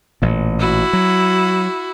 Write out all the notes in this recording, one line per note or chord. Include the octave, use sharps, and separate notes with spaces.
A1 A#2
E4 F#4
F#3